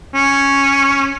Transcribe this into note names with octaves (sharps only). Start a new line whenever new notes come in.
C#4